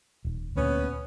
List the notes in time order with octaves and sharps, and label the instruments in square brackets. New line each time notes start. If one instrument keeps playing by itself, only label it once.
[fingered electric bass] D#1
[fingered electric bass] D2 A#2 [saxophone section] B3 C#4